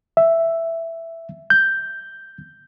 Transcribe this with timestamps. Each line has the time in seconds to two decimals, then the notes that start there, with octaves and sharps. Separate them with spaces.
0.17 E5
1.50 G6